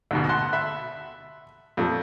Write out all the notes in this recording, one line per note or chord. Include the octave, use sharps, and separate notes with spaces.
D2 G#2 B2
F#5 A5 C6 F#6
E5 B5
F2 A#2 A3